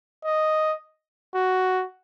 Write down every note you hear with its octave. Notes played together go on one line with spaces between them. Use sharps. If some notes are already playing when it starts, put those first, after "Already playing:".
D#5
F#4